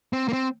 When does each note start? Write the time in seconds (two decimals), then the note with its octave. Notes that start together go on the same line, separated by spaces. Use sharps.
0.13 C4
0.28 A#3
0.33 C4